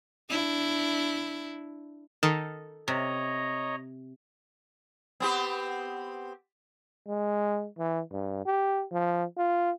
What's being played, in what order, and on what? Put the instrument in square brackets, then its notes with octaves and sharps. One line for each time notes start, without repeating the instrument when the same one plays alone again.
[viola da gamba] D4 E4
[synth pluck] D#3 [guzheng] A4
[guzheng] C3 [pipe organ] C#5 D#5 A#5
[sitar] B3 C4 G4
[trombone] G#3
E3
G2
G4
F3
F4